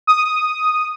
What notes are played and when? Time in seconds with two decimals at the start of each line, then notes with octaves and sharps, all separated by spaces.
0.07 D#6